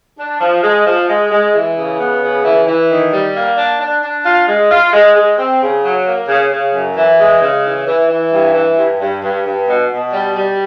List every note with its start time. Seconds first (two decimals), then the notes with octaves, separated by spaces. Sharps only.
0.17 D4
0.40 F3
0.62 G#3
0.86 F3
1.08 G#3
1.30 G#3
1.53 E3
1.76 C#3
1.98 B3
2.21 C#3
2.43 E3
2.66 E3
2.89 D#3
3.11 G3
3.34 A#3
3.56 D4
3.79 D4
4.02 D4
4.25 F4
4.47 G#3
4.69 F4
4.92 G#3
5.14 G#3
5.37 C4
5.60 C#3
5.83 F#3
6.05 A#3
6.28 C#3
6.50 C#3
6.72 F#2
6.96 E3
7.18 G#3
7.41 C#3
7.64 E3
7.86 E3
8.09 E3
8.31 G2
8.54 E3
8.77 G2
8.99 G2
9.21 G2
9.44 G2
9.67 B2
9.90 B2
10.12 G3
10.34 G3